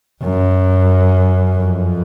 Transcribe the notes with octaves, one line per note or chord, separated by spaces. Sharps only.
F#2
F2